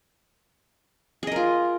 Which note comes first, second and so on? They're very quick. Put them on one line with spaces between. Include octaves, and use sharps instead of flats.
G#4 D#5 A#4 F4